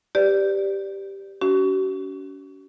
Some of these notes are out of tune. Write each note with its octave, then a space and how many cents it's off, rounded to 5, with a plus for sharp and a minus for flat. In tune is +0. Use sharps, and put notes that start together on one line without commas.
G4 +0 B4 +35 D5 +0
C#4 +40 F#4 +45